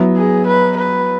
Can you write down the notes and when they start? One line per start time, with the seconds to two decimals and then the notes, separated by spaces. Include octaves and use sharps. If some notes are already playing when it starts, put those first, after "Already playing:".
Already playing: F#3 B3 E4
0.17 G#4
0.48 B4
0.78 B4